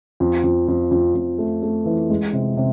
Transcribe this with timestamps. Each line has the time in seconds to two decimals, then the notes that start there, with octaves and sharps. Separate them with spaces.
0.20 F2
0.44 F2
0.68 F2
0.91 F2
1.15 F2
1.38 A3
1.63 A3
1.86 E3
2.10 G#3
2.33 C3
2.57 C3